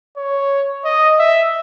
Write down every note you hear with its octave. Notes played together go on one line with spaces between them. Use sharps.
C#5
D#5
E5